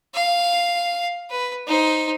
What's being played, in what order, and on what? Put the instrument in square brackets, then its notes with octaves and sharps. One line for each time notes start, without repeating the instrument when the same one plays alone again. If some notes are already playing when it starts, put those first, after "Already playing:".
[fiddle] F5
B4
D#4 C5